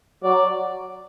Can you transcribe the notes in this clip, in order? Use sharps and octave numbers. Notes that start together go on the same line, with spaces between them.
F#3 D5